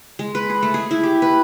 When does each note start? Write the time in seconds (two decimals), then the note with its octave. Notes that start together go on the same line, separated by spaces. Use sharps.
0.19 G#3
0.35 B4
0.50 G#4
0.63 A3
0.74 G#4
0.91 E4
1.03 G4
1.22 B4